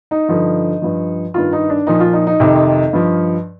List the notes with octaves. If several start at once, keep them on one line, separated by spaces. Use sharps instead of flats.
D#4
G2 D3 F3
G2 F3
G2 D#3 F4
D#4
D4
A#2 F3 D#4
F4
D#4
D#4
F2 C3 D#3
G2 F3